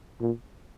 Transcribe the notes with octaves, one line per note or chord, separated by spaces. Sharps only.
A#2